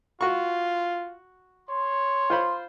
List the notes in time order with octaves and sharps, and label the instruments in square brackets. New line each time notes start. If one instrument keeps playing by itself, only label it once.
[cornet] F4 [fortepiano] F#4 C#6
[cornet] C#5 [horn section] C6
[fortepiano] F4 C5 B5